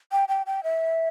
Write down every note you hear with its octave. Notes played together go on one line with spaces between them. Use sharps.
G5
G5
G5
E5